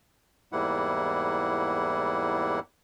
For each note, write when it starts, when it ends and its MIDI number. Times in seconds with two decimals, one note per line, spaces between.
0.52 2.59 40
0.52 2.59 44
0.52 2.59 55
0.52 2.59 58
0.52 2.59 64
0.52 2.59 78